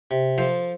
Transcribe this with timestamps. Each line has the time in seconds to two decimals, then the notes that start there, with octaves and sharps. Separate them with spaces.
0.11 C3
0.38 F3 A4 C5